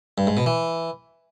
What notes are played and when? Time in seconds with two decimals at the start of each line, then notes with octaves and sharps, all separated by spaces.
0.18 G2
0.27 G#2
0.37 B2
0.46 E3